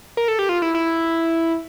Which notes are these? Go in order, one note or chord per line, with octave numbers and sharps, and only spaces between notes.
A#4
A4
G4
F4
E4
E4